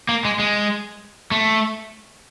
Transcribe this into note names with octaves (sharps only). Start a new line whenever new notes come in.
A#3
G#3
G#3
A3